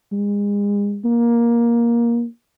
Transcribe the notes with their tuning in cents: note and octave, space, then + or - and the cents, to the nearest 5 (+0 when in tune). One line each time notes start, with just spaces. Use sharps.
G#3 -35
A#3 +15